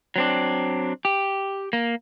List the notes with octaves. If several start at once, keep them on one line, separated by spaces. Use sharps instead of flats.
F#3 C4 D4
G4
A#3